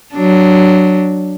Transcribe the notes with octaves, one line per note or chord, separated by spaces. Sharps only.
F#3 D4